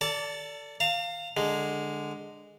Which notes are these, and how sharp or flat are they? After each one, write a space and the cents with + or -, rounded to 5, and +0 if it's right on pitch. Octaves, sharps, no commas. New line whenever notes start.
A4 +25 D5 -20 A5 +0
F5 +0 A5 +45
D3 +10 G#3 -5